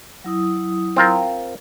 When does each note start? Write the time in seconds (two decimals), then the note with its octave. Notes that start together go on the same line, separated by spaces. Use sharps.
0.24 F#3 E4 D#6
0.97 C4 F4 A#4